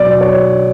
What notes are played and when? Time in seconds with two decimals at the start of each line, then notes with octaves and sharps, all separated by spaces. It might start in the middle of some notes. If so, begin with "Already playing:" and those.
Already playing: B2 F#3 D5
0.21 C#5